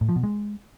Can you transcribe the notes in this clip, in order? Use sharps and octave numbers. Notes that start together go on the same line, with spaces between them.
A2
F3
B2
G#3